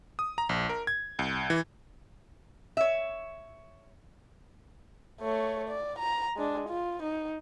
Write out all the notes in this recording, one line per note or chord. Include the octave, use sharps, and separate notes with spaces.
D#6
A#5
A#1
A#4
G#6
C2
E3
C#5 E5
A3 C#5
D5
A#5
G#3 D4
F4
D#4